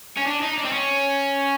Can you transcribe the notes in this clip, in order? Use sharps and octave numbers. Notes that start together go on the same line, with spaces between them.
C#4
D4
D#4
D4
C4
C#4